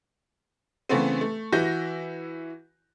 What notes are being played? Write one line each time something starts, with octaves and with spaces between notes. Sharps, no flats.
C#3 E3 A3 B3 C4
A3
E3 E4 F#4 G6 A#6